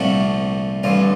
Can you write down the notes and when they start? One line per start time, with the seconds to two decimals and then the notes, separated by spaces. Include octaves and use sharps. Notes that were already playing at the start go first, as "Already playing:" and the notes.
Already playing: C2 A#2 F3 A3 F#4
0.83 A1 G2 D3 F4